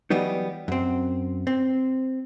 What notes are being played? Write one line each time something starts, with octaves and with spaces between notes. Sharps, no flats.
E3 F#3 G3 B3 D#4
F#2 C4
C4